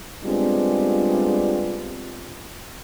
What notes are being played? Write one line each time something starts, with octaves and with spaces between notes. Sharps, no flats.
G3 G#3 B3 C4 D4 F4